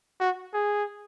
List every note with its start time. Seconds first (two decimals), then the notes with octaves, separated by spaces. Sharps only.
0.20 F#4
0.53 G#4